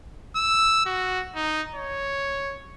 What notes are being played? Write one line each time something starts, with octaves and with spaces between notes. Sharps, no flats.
E6
F#4
D#4
C#5